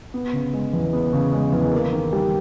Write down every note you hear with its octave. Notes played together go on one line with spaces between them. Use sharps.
B3
C#3
G#3
E2
B3
C#3
G#3
E2
A#3
D#3
G3